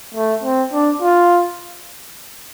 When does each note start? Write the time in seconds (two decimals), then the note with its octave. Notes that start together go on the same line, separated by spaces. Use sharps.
0.15 A3
0.43 C4
0.73 D4
1.02 F4